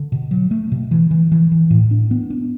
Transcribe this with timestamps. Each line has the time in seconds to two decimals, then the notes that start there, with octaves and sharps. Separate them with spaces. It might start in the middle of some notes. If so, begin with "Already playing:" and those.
Already playing: D3
0.12 B2
0.31 F#3
0.51 A3
0.72 B2
0.91 E3
1.11 E3
1.32 E3
1.52 E3
1.70 A2
1.91 D4
2.11 B3
2.30 D4